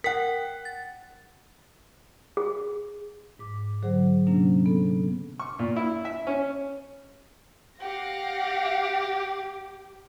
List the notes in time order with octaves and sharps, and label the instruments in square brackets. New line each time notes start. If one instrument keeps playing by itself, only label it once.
[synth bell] A#4 G5 [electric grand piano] F#5 B6
[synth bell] A6
[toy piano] G#4
[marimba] G#2 D6
D3 F#3 G#4 C5 F#5
C3 F#3 A#3 C#4 D4
B3 A4
[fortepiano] C#6
A#2
E4
E5
C#4
[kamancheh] G4 [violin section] F5 F#5 A#6